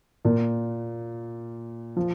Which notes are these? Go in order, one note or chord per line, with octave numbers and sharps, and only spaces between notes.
A#2 A#3
F3